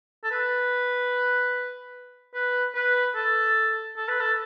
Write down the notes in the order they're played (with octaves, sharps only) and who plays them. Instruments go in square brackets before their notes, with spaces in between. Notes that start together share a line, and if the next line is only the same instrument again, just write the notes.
[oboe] A4
B4
B4
B4
A4
A4
B4
A4